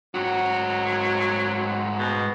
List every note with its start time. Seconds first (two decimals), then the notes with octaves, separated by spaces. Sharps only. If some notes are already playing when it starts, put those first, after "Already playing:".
0.14 G#2 F#3 F#4
1.99 B2